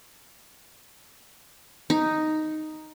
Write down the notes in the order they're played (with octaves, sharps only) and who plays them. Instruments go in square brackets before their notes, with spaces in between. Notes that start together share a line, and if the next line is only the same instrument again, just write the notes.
[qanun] D#4